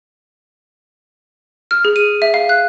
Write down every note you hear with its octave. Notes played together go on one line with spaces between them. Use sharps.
F6
G#4
D#7
E5
F5
F#6